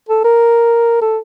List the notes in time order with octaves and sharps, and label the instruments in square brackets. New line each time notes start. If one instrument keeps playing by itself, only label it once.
[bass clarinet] A4
A#4
A4